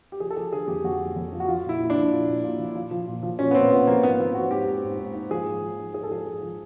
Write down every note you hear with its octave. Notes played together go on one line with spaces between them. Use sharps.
G4
F3 G#4
A4
F3 G#4
D3 G#4
F2 G4
F2 F#4
F3
F2
F3
F#4
F3 F4
A#2
E4
A#2
D4
F3
A#2
A#2
A#2
F3
F3
F3
A#2
F3
A#2 C#4
B3
A#2 C4
A#2 B3
F3 A#3
G#2 B3
F3 C4
G#2 F#4
G#2 G4
G#2
G#2
G#2
G#2
F3 G#4
G#2
F3
G#2
G#2 G#4
A4
F3 G#4
G#2
F3